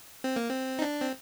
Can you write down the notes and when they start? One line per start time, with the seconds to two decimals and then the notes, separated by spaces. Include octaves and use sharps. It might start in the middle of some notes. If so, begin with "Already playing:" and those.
0.24 C4
0.36 A#3
0.49 C4
0.79 D#4
0.82 D4
1.01 C4